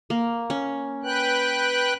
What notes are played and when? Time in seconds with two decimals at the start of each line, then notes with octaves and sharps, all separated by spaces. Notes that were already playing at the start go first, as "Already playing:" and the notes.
0.10 A#3
0.50 C#4
1.03 B4 G5 F#6